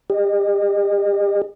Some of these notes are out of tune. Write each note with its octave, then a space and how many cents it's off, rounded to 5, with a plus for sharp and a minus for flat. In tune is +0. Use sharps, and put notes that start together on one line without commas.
G4 +35 D#5 -30